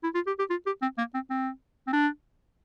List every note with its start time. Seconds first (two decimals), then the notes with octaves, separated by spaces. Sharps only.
0.03 E4
0.15 F4
0.27 G4
0.39 G4
0.50 F4
0.66 G4
0.82 C4
0.98 A#3
1.14 C4
1.30 C4
1.87 C4
1.93 D4